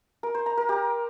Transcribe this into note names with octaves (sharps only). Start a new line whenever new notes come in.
A#4
C5
A#5
A#4
G4